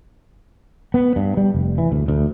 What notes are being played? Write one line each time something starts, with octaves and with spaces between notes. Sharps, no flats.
B3
G2
G3
F1
E3
D2
D2